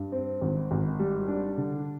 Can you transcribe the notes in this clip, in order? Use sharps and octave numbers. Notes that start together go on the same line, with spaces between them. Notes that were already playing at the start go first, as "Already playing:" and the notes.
Already playing: G2
C4
G#1
G#1
G3
D4
D3